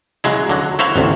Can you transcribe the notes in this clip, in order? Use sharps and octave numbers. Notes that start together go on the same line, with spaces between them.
C#3 F#3 G#3 E4
D3 F#3
E4 F#4 C5 C#5 E5 F5
A1 D2 C3